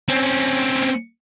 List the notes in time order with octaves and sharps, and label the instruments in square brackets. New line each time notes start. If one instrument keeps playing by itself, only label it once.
[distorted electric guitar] C4 C#4